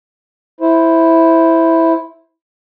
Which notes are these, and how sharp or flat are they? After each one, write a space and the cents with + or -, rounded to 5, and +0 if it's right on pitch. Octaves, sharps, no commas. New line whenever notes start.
E4 +0 C5 +0